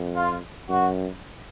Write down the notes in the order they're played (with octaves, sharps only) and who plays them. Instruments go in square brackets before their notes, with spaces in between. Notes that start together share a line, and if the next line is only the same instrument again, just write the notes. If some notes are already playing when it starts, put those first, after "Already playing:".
Already playing: [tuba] F2
[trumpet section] F4
[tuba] F#2 [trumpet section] F#4